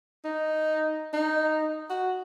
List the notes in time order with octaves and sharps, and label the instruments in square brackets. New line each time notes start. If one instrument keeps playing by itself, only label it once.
[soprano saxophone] D#4
D#4
F#4